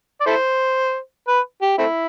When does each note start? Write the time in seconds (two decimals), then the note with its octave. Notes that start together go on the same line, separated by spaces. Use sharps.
0.21 D5
0.26 E4 A4 C5
1.28 B4
1.62 G4
1.78 A3 C4 E4